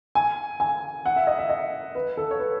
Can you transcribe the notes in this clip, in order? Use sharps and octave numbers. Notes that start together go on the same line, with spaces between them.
G#5
G#5
F#5
E5
D#5
E5
D#5
B4
A4
C#5
B4